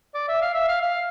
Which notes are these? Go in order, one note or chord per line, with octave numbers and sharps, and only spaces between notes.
D5
E5
F5
E5
F5
F5